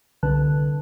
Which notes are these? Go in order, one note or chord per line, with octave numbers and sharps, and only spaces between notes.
C2 D3 B4 A5 F#6